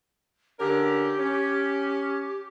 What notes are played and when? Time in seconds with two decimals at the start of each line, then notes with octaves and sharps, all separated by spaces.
0.59 D3 C#4 G4 A#4
1.18 C#4